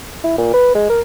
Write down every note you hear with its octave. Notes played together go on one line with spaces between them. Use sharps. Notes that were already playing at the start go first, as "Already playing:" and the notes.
E4
A#2
B4
G#3
A#4